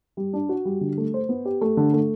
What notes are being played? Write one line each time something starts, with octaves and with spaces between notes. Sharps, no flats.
G3
D4
F#4
G3
D3
A3
C5
B3
G4
A3
D3
A3